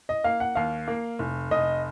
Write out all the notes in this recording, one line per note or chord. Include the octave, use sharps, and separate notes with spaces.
D#5
A#3 F5
F#5
D#2 F5
A#3
F1
F1 D#5